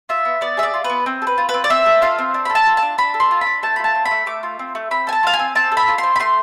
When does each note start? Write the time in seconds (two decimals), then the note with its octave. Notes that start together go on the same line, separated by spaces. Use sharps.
0.09 F4 E5
0.25 B3
0.41 B3 D5
0.57 G#4 E5
0.63 D5
0.74 F4
0.84 B4
0.90 B3
1.06 C4
1.22 A4
1.27 B4
1.38 F4
1.49 B4
1.54 C4
1.64 D5
1.70 C4 E5
1.86 A4
2.02 F4 F5
2.18 C4
2.34 D4
2.45 A4 B5
2.55 A5
2.66 F4
2.77 A5
2.83 D4
2.98 D4 B5
3.14 A4
3.20 C6
3.31 F4
3.41 B5
3.46 D4
3.63 A3 A5
3.76 B5
3.79 F4
3.84 A5
3.95 C4
4.05 B5
4.11 A3
4.26 A3 D6
4.43 F4
4.59 C4
4.75 A3
4.91 C4 B5
5.07 A4 G#5
5.13 A5
5.23 F4 F5
5.34 G#5
5.39 C4
5.55 C4 A5
5.72 A4
5.77 B5
5.88 F4
5.98 C6
6.03 C4
6.16 B5
6.20 A3 C6